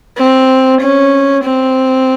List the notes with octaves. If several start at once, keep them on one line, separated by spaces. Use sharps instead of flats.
C4
C#4
C4